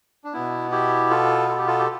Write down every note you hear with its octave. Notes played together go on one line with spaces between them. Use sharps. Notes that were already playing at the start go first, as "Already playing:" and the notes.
D4
B2 B3 E4
E4 G4
F4 A4
A4
G4
F4 A4
G4